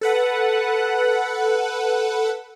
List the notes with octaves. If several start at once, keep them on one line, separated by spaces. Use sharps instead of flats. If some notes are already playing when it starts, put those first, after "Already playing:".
A4 B4 F#5